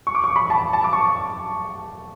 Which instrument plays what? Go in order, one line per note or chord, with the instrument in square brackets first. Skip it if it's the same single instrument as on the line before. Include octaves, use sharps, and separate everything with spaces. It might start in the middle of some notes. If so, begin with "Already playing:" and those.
[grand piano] C#6
D6
C#6
B5
A5
A5
D6
C#6